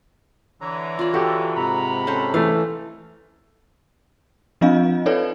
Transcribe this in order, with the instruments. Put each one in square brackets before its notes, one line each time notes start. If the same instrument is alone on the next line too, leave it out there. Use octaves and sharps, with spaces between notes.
[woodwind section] D3 E3 [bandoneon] C#5 A#5
[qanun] F4 D5
[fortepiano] F#4 G4 [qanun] A4
[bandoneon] G#2 C3 [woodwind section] F#5 A#5 B5
[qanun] C#4 A4 C5
[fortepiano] E3 A3 [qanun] F5
[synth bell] F3 C4 D4 F4 D#5 F5
D#4 A4 B4 C#5 D5